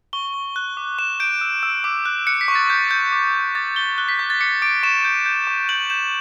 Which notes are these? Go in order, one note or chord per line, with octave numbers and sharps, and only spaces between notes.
C#6 G7
C#6
F#6
D6
C#6 E7
G6 D7
E6
E6
D6
F#6
F#6 C#7
B6
C#6
A6
G6
G6
D6
D6
D6 A6
G6 G7
F#6 G7
B6
D6 G6
A6
D6 C#7
D6 D7
C#6 E7
G6
G6
C#6
G6 F#7
G6 E7